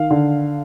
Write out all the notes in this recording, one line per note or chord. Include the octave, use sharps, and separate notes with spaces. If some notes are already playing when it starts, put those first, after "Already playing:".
Already playing: D#3 F5
D3